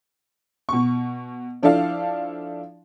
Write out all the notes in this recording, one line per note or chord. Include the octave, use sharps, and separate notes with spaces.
B2 C#6
F3 D4 E4 A4 D5 F5